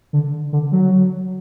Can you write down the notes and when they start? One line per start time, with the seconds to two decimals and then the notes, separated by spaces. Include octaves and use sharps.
0.13 D3
0.53 D3
0.72 F#3